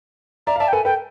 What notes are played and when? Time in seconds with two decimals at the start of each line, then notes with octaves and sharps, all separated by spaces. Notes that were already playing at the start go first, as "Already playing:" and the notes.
0.47 D5 E5 A#5
0.56 F5
0.60 D5 E5 A5
0.68 G5
0.73 A4 B4 G#5
0.85 A4 B4 G5